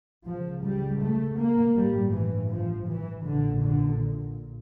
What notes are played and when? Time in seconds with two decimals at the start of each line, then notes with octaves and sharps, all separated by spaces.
0.25 C#2 C#3 F3
0.63 G3
1.01 A3
1.37 A#3
1.75 A1 G2 G3
2.12 E3
2.51 F3
2.88 E3
3.25 A#1 A#2 D3
3.63 D3